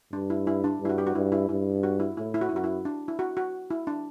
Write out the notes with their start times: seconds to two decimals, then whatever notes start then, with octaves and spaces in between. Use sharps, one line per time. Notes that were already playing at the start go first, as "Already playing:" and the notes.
0.13 G2 D4
0.30 E4
0.47 E4
0.64 D4
0.81 G2 E4
0.89 F#4
0.98 G4
1.07 F#4
1.15 G2 E4
1.32 E4
1.49 G2 E4
1.83 F#4
2.00 E4
2.17 A2 E4
2.34 E4
2.41 F#4
2.49 F#2 E4
2.56 F#4
2.64 E4
2.85 D4
3.08 E4
3.19 F#4
3.37 F#4
3.70 E4
3.87 D4